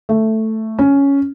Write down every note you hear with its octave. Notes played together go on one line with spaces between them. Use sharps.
A3
C#4